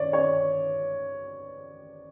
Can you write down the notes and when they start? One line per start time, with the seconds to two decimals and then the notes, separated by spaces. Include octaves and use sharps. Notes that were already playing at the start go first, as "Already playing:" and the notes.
Already playing: C#5 D5
0.13 C#5